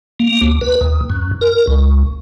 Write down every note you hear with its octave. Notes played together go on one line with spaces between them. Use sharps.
A#3
D2
B4
D#2
F#2
A#4
C#2